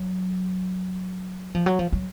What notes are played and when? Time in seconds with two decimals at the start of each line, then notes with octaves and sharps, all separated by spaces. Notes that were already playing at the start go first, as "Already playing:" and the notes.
Already playing: F#3
1.55 F3
1.66 F#3
1.79 F3
1.92 F#3